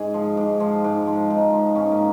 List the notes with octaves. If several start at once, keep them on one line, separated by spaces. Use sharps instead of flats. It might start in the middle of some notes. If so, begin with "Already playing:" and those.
Already playing: G#2 G#4
F3
G#2
F3
G#2
F3
G#2 D#4
F3
G#2 C#4
A#3